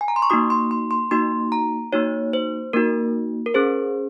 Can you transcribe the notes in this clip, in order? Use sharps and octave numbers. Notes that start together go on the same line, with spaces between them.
G#5
A#5
C6
C#6
A#3 D#4 F#4 D#6
C6
C6
C6
A#3 D#4 F#4 C6
A#5
A#3 D#4 F#4 C#5
C5
A#3 D#4 F#4 A#4
A#4
C#4 G#4 C5